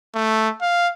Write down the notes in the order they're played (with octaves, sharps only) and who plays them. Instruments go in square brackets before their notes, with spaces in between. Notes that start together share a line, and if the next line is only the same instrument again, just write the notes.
[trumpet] A3
F5